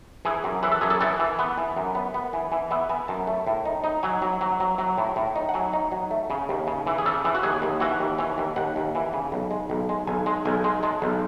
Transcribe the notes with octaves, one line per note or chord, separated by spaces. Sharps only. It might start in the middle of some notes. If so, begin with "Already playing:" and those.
E3 G#4
F#2
E3 B4
A4
F#2 G#4
A4
E3 A4
E3
B3
E3
F#2
B3
B3
E3
E3
B3 E5
B3 G#5
F#2 A5
A3
A2
D#4
D#4
F#3 G#5
F#3
F#3
F#3
F#3
A2
A2
D#4
F#5
F#3 G#5
D#4
F#3
A3
C#3
D#2
C#3
E3
G#4
C#3 A4
E3
F#4
D#2 G#4
D#2
E3 F#4
D#2
E3 C#5
D#2
D#2 F#5
D#2
E3
C#3
B1
G#3
B1
G#3
B1 G#5
G#3
B1 G#5
G#3
G#3 A5
B1